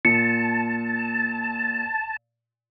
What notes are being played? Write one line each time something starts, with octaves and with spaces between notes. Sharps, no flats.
A#2 A5 C#7